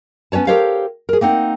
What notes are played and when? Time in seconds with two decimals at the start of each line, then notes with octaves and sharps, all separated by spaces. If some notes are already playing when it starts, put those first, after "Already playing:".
0.32 B3 C#4 B4 C#5 A5
0.47 G4 A4 A#4 C5 C#5 F5
1.09 G#4 A#4
1.21 A#3 C4 D#4 F#5